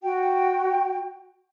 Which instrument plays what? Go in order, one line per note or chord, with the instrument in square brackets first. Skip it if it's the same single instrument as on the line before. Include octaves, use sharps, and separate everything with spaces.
[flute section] F#4 G5